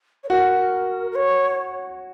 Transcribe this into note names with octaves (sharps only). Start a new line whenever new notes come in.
C#5
F#4 A#4
A#4
C#5